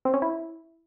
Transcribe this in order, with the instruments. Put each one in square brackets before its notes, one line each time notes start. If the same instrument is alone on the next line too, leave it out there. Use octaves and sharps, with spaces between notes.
[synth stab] C4
C#4
E4